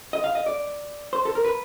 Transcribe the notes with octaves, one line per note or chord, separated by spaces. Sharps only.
D#5
F5
D#5
D5
C5
A4
A#4
B4